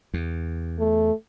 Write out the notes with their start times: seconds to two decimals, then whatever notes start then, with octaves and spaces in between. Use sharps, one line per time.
0.14 E2
0.79 A3